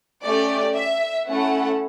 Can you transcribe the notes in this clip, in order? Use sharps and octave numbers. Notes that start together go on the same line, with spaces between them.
A3 C#4 G4 D5
E5
A3 C#4 E4 A4 F#5